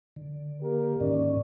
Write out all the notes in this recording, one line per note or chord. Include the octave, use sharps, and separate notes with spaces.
D3
A#3 G4 A#4
G#2 D#3 C#4 D5